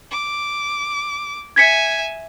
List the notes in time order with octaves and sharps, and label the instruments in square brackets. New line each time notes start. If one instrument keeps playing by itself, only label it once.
[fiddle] D6
[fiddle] E5 G#5 [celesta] G#6 B6 C#7